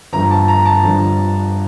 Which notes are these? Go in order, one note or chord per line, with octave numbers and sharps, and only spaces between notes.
G1 G2 D3 F3 A#5
A5
A#5
A5
G1 G2 D3 F3